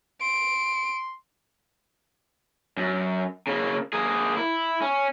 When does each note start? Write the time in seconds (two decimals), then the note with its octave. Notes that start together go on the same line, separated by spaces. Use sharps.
0.21 C6 D7
2.77 F#2
3.47 C#3 A#3
3.93 A#3 G#4
4.37 E4
4.81 C#4